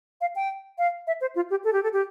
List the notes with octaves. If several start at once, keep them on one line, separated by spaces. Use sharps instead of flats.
F5
G5
F5
E5
C5
F4
G4
A4
G4
A4
G4